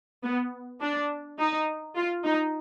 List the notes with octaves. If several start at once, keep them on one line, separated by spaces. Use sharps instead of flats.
B3
D4
D#4
F4
D#4